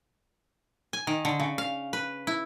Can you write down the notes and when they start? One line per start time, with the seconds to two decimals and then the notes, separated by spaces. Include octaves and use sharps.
0.93 G#5
1.07 D#3
1.25 D3
1.40 C#3
1.58 F5
1.93 B4
2.27 E4